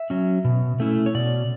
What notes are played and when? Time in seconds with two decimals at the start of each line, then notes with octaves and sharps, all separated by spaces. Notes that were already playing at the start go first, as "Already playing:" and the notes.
Already playing: E5
0.10 F#3 C#4
0.45 B2
0.80 A3 C#4 E4
1.06 C#5
1.15 B2 D5